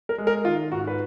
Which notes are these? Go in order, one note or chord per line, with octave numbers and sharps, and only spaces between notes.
A#4
G#3
A#4
D#3 F4
G#2 F#4
B4